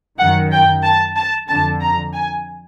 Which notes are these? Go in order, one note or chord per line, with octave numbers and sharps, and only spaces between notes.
F#2 D#3 F#5
G5
A5
A5
F2 D3 A5
A#5
G#5